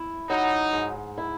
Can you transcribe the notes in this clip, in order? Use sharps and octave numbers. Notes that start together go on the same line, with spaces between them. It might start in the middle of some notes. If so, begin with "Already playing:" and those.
Already playing: E4
F#3 D#4
G#2
E4